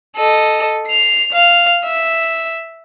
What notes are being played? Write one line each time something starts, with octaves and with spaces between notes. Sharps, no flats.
A4 D#5
C7 F7
F5
E5